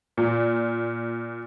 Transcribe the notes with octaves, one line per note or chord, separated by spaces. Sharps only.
A#2